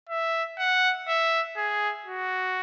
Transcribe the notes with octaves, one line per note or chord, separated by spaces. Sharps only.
E5
F#5
E5
G#4
F#4